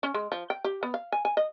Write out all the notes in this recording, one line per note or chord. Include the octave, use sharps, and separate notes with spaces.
C#4
G#3
F3
G5
G4
B3
F5
G#5
G#5
D#5